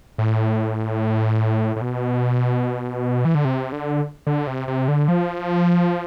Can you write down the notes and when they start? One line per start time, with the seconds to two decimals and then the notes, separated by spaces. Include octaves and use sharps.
0.18 A2
1.76 A2
1.81 B2
3.25 E3
3.35 D3
3.45 C3
3.72 D3
4.27 D3
4.47 C3
4.68 C3
4.88 D3
5.08 F3